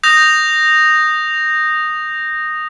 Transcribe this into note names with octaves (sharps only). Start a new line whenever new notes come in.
D#6 G6 A#6 F7